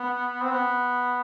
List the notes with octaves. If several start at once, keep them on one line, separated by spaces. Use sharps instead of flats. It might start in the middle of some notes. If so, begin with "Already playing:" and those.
Already playing: B3
C4
B3